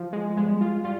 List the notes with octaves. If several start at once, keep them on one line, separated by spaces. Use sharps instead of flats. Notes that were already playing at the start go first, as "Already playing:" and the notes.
Already playing: F3
G#3
G3 G#3 B3
F4
G3 F4